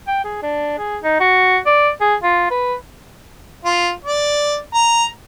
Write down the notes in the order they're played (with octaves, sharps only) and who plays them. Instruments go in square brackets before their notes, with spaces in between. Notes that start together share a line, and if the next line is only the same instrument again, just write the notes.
[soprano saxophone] G5
G#4
D4
G#4
D#4
F#4
D5
G#4
F4
B4
[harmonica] F4
D5
A#5